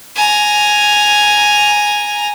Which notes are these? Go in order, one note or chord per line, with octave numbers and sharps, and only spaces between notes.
G#5 A#5